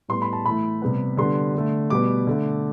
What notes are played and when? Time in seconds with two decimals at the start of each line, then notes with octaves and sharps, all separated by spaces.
0.08 A2 G3 B3 C6
0.22 B5
0.33 A5
0.45 A2 E3 A3 B5
0.82 C3 G3 B3
1.17 D3 G3 B3 C6
1.55 D3 A3
1.90 B2 G3 B3 D6
2.27 D3 A3